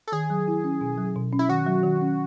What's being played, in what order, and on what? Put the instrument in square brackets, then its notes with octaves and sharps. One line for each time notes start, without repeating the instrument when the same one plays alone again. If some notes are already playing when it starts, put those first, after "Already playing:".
[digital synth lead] A4
[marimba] D#3 [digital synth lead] G#4
[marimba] F#3
E4
C#4
B2
F#3
B2
C#4
[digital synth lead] E4
[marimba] D#3 [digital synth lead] F#4
[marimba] F#3
D#3
C#4